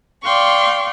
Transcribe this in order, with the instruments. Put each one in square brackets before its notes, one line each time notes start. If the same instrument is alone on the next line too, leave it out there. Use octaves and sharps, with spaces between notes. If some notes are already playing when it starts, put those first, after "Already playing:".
[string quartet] D5 F5 G5 C6 C#6